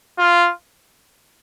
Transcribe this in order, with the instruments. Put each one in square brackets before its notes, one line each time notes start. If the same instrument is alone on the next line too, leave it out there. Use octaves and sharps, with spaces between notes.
[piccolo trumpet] F4